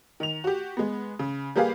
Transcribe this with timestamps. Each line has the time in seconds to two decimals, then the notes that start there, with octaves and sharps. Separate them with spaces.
0.20 D#3 F7
0.44 F#4 G4
0.77 G#3 B3
1.19 C#3
1.56 G3 A#3 G4 G#4 B4 F5